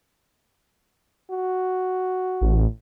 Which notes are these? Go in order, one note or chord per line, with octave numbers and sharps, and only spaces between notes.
F#4
A1